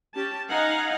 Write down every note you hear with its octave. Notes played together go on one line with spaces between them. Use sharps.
C#4 G4 A5
D#4 F5 F#5 G#5 A#5